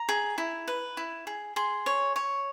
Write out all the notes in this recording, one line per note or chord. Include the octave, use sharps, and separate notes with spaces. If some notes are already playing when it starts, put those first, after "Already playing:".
Already playing: A#5
G#4
E4
B4
E4
G#4
G#4 C6
C#5
C#5